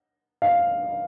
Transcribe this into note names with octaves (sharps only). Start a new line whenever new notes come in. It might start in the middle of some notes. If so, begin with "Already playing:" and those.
F5